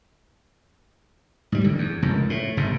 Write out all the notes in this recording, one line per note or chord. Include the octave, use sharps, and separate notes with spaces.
G#2 G3
A1 D3
E2
F1 C#2 F#2
A2
F#1 G#2 C3